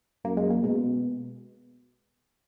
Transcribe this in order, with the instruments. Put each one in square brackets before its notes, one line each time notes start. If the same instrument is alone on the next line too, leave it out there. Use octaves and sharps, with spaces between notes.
[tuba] F#2 [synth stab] A#3
[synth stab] G#3
A#3
[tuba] B2 [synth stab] G#3